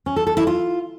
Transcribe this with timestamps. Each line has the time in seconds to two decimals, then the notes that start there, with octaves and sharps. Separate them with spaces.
0.06 C#4
0.16 A4
0.27 A4
0.37 E4
0.47 F4